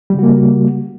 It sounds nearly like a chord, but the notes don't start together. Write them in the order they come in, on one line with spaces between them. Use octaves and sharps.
G3 C#3 F#4 A#3